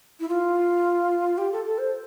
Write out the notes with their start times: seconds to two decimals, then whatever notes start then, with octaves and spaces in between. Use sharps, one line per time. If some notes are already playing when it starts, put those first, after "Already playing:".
0.20 E4
0.29 F4
1.38 G4
1.52 A4
1.65 A4
1.78 C5